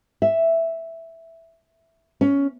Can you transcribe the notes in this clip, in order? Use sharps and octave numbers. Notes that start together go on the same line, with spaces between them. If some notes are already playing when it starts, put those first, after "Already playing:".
E5
C#4